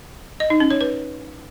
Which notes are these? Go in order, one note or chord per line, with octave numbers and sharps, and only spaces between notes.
D#5
D#4
C#4
C#5
B4